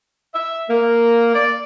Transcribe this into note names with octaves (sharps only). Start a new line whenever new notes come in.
E5
A#3
D5